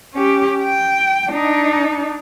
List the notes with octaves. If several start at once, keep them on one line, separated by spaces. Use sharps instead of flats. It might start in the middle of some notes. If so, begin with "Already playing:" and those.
C#4 G4
G5
D4 D#4